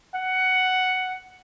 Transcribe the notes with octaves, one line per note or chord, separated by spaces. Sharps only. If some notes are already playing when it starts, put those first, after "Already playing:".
F#5